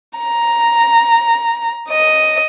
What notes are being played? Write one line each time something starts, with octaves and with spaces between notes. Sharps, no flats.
A#5
D#5 D#7